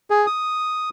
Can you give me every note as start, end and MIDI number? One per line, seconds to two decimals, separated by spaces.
0.10 0.26 68
0.26 0.90 87